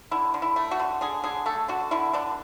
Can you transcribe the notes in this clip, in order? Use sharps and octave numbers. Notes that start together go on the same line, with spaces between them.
D3 E4
D3
E4
A3
F#4
D3
D3 G#4
D3 G#4
A3 A4
D3 F#4
D3 E4
D3 D4